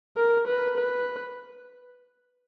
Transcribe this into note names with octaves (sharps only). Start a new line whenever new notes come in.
A#4
B4
B4